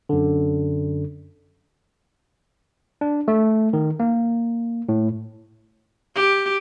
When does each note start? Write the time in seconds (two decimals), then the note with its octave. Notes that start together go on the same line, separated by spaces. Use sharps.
0.09 F#2 D3
3.01 D4
3.28 A3
3.73 D#3
4.00 A#3
4.89 A2
6.15 G4